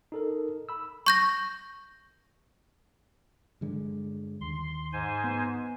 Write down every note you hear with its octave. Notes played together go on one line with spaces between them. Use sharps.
D#4 A4 A#4
B5 E6
C#6 G6 A#6
G2 D3 G#3
D#2 C6
G#2 C5 G#5
B3